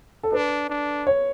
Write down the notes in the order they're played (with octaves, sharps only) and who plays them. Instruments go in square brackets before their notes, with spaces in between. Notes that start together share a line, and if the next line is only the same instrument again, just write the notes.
[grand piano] A4
[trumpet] D4 [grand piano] B4
[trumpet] D4
[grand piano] C#5